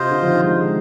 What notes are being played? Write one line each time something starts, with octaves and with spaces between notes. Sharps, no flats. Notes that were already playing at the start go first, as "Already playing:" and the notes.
Already playing: C3 F4 C5 D#5
D3
F3
D#3
G#3